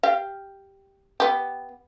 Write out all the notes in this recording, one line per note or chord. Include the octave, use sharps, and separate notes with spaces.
G4 F5
B3 G4